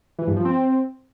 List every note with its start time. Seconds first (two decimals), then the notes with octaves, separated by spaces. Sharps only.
0.19 E3
0.27 G2
0.36 F3
0.45 C4